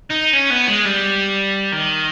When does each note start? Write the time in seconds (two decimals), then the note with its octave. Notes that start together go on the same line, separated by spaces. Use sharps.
0.10 D#4
0.33 C#4
0.50 B3
0.68 G#3
0.85 G3
1.72 D#3